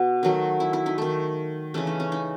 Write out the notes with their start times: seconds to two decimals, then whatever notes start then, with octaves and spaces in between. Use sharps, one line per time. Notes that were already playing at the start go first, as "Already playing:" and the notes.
Already playing: B2 B3
0.23 D#3 F#3 A3
0.60 E4
0.73 E4
0.86 D#4
0.98 D#3 A3
1.74 C#3 E3 A3 C#4
1.87 D#4
2.00 C#4
2.12 D#4